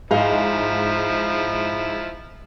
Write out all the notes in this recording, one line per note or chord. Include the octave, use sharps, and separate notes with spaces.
G#2 F3 E4 G#4 D#5 F5